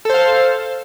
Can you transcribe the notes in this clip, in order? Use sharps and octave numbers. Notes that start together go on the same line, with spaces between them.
A4 C5 F5